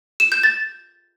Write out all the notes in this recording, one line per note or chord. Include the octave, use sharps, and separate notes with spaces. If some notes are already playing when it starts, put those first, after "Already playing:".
E7
G6
A6